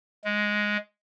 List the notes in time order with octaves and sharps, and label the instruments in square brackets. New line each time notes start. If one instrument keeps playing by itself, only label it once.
[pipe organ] G#3